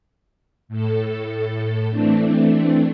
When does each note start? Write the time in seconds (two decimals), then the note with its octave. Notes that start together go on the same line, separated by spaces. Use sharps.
0.68 A2 A4
1.91 E3 A3 C4 D4